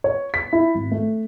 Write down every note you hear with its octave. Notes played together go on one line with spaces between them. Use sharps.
C#5
B6
E4
G#1
A3